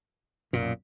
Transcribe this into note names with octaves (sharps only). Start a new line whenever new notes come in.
B1 F#2 A#2